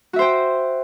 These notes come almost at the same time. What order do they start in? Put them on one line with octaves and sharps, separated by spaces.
F#4 E5 C5 G5